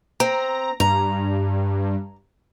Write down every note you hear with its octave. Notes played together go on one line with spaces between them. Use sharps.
C4 A#5
G2 A#5